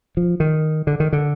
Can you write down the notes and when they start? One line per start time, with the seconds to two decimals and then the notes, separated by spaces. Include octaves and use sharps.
0.17 F3
0.40 D#3
0.87 D3
1.00 D#3
1.13 D3